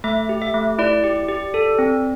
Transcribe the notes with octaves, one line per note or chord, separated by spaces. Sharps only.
A3 E5
G4
E5
A3
E4 D5
G4
G4
A4
C4